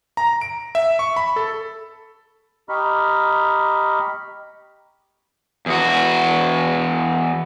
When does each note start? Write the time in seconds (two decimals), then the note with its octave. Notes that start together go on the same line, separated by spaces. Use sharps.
0.17 A#5
0.41 D7
0.75 E5
0.99 C#6
1.16 B5
1.36 A4
2.69 G4 D#5 A#5 B5 C#6 F6
5.66 E2 F#4